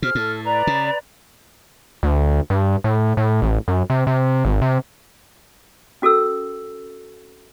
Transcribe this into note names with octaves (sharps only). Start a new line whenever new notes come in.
B2 G#4 C5 F6
A2 A4
B4 D5 A#5
C#3
D2
G2
A2
A2
A1
F#2
C3
C3
G#1
C3
C#4 F#4 A4 A#4 E6